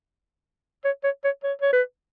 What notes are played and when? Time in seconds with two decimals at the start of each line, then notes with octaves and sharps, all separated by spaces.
0.85 C#5
1.04 C#5
1.24 C#5
1.43 C#5
1.62 C#5
1.73 B4